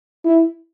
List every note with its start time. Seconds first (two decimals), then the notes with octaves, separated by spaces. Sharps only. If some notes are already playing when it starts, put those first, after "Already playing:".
0.25 E4